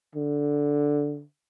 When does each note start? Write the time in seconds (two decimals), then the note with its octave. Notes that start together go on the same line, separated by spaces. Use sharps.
0.16 D3